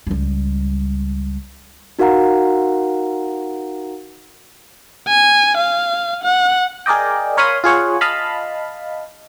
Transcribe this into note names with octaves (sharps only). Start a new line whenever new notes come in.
C#2 G3
D#4 F#4 A#4 F5 F#5 A#5
G#5
F5
F#5
G#4 A#4 D5 D#5 G5
A#4 C#5 F5 B5 C6 D#6
F4 G#4 C#5 F#5
D#5 F5 A5 B5